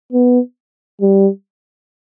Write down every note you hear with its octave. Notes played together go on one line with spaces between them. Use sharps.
B3
G3